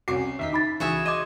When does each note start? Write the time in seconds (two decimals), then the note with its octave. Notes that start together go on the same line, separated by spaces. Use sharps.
0.08 C2 C#4 F#4 D6 C7
0.39 D#2 D#4 E5 B6
0.53 D#4 B5 D6 A6
0.80 C#2 E3 F#4 G#4 E5
1.06 D#5 C6 D6 G#6 D#7